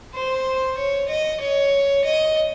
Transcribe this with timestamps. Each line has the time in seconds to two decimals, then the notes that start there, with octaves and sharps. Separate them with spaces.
0.14 C5
0.77 C#5
1.08 D#5
1.41 C#5
2.04 D#5